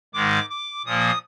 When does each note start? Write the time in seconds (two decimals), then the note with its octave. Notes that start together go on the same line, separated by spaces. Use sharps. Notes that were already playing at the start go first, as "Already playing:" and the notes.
0.14 G#2 D#3 G#3 D6
0.50 D6
0.85 A#2 F3 A#3 D#6